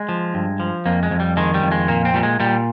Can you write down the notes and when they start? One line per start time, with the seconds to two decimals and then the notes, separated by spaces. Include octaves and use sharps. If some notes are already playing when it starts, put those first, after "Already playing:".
Already playing: G#3
0.09 F3
0.34 G2
0.60 F3
0.85 F2 A#3
1.03 G#3
1.11 F2
1.20 G3
1.37 D#3 G#3
1.54 G3
1.63 F2
1.72 G#3
1.88 A#2 A#3
2.05 C4
2.14 A#2 G3
2.23 G#3
2.40 A#2 G3